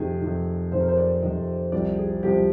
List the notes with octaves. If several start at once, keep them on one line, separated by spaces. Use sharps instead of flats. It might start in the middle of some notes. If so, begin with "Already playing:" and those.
Already playing: F2 C3 D#3 G#4
F2 C3 D#3
F2 C3 D#3 C5
A#4
C5
D5
F2 C3 D#3 D#5
C2 C3 F3 D5
G#4
C2 C3 F3 G4